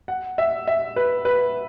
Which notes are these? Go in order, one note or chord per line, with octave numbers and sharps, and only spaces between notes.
F#5
E5
E5
B4
B4